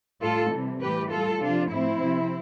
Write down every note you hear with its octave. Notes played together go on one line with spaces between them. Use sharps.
A2 G3 F4 A4
C3 E3 G3
A2 E3 G3 G4 B4
A2 G3 F4 A4
C3 F3 D4 F4
A2 F3 C4 E4
C3 F3